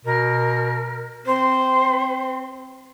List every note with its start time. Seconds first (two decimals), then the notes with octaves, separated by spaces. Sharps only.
0.05 B2 A#4
1.26 C4 C5